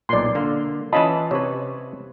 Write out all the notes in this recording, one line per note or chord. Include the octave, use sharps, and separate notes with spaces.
B1 A#2 D5 C6
D3 A#3
E3 C#4 F4 D#5 A5 B5
C3 B4 C#5